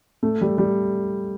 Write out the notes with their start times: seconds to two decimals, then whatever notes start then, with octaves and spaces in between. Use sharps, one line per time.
0.23 A3
0.41 G3
0.58 G3